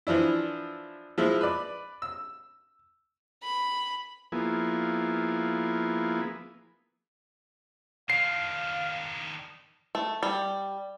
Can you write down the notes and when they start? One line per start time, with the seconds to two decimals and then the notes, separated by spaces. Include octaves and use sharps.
0.07 E3 F3 D4 E4
1.18 F3 G#3 E4
1.41 B4 D5
2.02 E6
3.43 B5
4.32 F3 A#3 B3 E4 G#4
8.10 D#3 D4 F5 C7
9.95 A3
10.23 G3